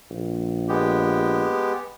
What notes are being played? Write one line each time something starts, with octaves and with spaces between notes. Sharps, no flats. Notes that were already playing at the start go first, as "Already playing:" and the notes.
A#1
G#3 B3 G4